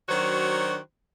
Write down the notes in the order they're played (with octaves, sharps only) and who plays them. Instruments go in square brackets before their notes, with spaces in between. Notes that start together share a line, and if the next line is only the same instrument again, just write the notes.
[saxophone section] D#3 F#3 D4 F#4 C5 C#5